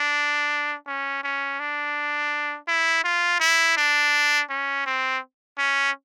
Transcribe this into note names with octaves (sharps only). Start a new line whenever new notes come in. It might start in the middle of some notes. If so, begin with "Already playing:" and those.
Already playing: D4
C#4
C#4
D4
E4
F4
E4
D4
C#4
C4
C#4